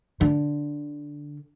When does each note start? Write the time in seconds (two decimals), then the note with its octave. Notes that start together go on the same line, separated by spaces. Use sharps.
0.21 D3